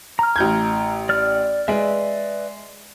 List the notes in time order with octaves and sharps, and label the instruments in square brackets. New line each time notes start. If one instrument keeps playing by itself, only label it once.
[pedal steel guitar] A#5 F6
[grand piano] A1 G6 G#6
[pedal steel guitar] D5 F6
[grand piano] G#3 [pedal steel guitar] B4 D5 E5